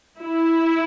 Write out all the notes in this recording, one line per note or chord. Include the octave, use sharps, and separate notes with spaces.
E4